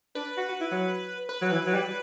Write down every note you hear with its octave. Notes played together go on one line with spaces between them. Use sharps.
D4 B4
F#4
F#4
E4
F#3
B4
F#3
E3
F#3
G3